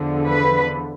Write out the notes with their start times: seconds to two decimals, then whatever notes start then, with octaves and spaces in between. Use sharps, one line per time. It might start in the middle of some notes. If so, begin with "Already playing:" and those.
Already playing: E2 D3 F3
0.25 B4